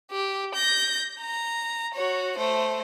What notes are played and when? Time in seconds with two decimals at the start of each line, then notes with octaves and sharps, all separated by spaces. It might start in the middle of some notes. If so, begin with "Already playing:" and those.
0.11 G4
0.55 G6 A#6
1.20 A#5
1.94 F#4 C#5
2.37 A3 C5